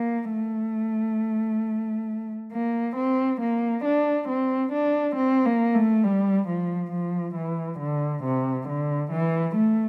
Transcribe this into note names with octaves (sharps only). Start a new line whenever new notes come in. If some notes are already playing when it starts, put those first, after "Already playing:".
Already playing: A#3
A3
A#3
C4
A#3
D4
C4
D4
C4
A#3
A3
G3
F3
F3
E3
D3
C3
D3
E3
A3